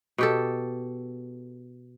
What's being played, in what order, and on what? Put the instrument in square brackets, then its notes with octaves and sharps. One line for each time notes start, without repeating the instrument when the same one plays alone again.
[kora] B2 G4 A4